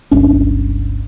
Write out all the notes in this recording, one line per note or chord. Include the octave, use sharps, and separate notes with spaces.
G1 C#2 C#4 D4